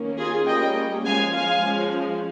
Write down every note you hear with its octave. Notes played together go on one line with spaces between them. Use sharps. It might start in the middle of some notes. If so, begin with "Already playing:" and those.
Already playing: D#3 A#3 C#4
F4 G#4
G3 A#3 C#4 D#5 G5
F3 G#3 C#4 F5 G#5
F5 G#5
F3 G#3 C#4